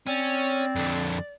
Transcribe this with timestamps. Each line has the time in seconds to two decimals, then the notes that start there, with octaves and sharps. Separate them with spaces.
0.07 C4 C#4 D5
0.75 F2 D3